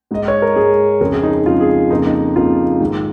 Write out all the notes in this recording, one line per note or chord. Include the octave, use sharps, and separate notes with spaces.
G#2 G#3 D#5
C#5
A#4
G#2 G#3 G#4
F2 C#3 G#3 A#4
G#4
D#4
D#4
F2 C#3 G#3 F4
G#4
F2 C#3 A#3 D#4
D#4
F2 C#3 A#3 F4
G#2 D#3 G#3